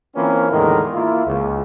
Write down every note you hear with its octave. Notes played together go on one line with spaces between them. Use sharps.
E3 A#3 C4 C#4 F4 B4
E2 A2 D3 D#3 G#3 A#4
A#3 E4 F4
C#2